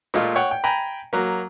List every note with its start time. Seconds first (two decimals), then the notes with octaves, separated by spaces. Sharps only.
0.14 A#2 G#3 A3 F4
0.36 C#5 F#5 G5
0.51 G5
0.64 G5 G#5 A#5 B5
1.13 F#3 A#3